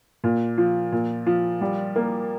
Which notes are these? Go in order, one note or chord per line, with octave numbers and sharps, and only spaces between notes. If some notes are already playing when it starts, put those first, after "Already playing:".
A#2
F3
A#2
F3
G3
A#3